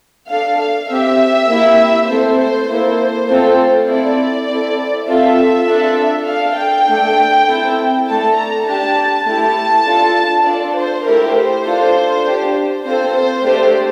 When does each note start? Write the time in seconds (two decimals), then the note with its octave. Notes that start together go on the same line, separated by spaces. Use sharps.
0.30 D4 A4 F5
0.60 F5
0.90 C4 G4 E5
1.49 A#3 E4 G4
2.09 A3 C4 E4 A4 C5
2.39 C5
2.69 A#3 E4 A4 C5
3.29 A3 C4 F4 A4
3.88 C4 E4 A4 D5
4.49 C4 E4 A4
5.08 C4 F4 A4 E5
5.67 D4 F4 A4
6.27 D4 A4 F5
6.58 G5
6.87 A3 D4 A4
7.47 C4 E4 A4
8.07 A3 D4 A4 A5
8.36 A#5
8.67 D4 G4 A5
9.26 A3 E4 G4 A5
9.86 D4 F4 A4
10.46 D4 F4 A4 D5
10.75 C5
11.05 A3 E4 G4 A#4
11.35 C5
11.65 D4 F4 A4
12.25 D4 G4
12.84 C4 F4 A4 C5
13.15 C5
13.44 A3 D4 G4 C5